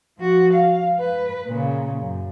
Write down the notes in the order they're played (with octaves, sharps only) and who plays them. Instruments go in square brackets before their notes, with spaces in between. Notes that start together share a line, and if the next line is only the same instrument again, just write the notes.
[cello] F3 F#4
F5
B4
A#2 C#3
F#2